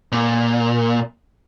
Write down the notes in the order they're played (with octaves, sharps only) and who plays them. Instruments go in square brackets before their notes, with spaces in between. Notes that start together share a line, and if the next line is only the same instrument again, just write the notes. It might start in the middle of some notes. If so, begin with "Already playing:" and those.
[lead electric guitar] A#2